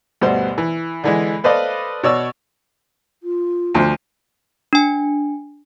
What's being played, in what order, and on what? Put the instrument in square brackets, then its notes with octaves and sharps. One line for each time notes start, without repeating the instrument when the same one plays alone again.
[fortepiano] D2 G2 B2 B3 C5
E3
D3 E3 G#3
A4 B4 C5 D5 D#5 F5
B2 C#5 D5 E6
[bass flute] F4
[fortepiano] D2 F3
[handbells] D4 G#5